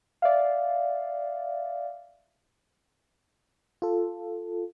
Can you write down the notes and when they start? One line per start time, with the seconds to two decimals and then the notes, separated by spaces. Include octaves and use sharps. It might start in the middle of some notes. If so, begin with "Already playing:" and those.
0.22 D5 E5 F5
3.82 F4 A4